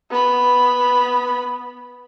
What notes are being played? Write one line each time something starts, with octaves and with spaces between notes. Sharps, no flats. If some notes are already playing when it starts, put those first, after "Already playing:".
B3 B5